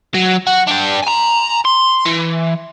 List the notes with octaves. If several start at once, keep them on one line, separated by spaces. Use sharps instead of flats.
F#3
F#4
D4 G5
G#5 A#5
C6
E3